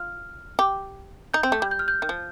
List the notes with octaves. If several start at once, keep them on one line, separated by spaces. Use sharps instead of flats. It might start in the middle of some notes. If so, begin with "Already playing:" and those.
Already playing: F4 F6
G4
D#4 G6
C4
A3 G6
G3
G6
F6
G6
D#3
F3